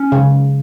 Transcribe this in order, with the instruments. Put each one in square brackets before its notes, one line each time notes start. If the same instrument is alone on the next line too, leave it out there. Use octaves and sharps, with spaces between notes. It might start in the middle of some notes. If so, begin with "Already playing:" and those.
Already playing: [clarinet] C#4
[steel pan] C#3